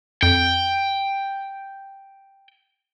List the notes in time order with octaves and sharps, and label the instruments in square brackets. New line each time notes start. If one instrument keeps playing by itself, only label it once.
[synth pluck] F2 [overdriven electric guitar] G5